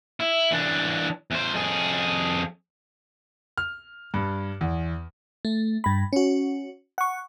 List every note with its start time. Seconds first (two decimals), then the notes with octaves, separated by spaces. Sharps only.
0.20 E4
0.52 E3 D4
1.31 E2 C5
1.54 F2 G#4
3.58 F6
4.14 G2
4.61 E2
5.45 A3
5.84 G2 B5
6.13 C#4 F#4
6.98 F#5 C#6